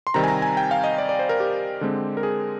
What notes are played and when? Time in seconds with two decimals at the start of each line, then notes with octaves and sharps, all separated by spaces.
0.07 C6
0.14 C3 D#3 G3 C4 A#5
0.24 G#5
0.28 A#5
0.42 G#5
0.57 G5
0.71 F5
0.84 D#5
0.98 D5
1.09 D5
1.19 C5
1.29 A#4
1.40 G4
1.81 D3 G#3 C4
2.17 A#4
2.23 G#4